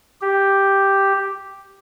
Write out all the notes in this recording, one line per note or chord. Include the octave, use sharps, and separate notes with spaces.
G4